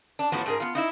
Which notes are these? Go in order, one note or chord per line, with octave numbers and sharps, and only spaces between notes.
D4
A2 F3 F#3 B3
G#2 G#4 A#4
B3 F4
D#4 E4 E5